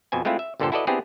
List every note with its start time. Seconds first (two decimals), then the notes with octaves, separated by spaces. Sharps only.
0.12 F2 B2 C5 G#5
0.25 G#3 A3 C4 E4 F4
0.39 E5
0.60 G1 A#2 D3 G4 A4 C5
0.72 E4 F#4 A4 B4 D5 D#5
0.87 B3 C4 D4 E4 G4 G#4